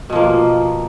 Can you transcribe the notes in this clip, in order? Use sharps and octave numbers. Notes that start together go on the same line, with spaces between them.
B2 F3 A#3